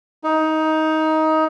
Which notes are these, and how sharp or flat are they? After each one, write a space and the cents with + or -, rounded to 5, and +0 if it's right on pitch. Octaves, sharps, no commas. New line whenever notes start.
D#4 +15